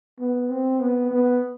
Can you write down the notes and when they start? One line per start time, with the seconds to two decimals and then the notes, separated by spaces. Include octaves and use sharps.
0.19 B3
0.49 C4
0.80 B3
1.11 B3